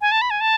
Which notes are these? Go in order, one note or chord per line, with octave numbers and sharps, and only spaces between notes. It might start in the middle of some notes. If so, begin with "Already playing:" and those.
G#5
A5
B5
G#5
A5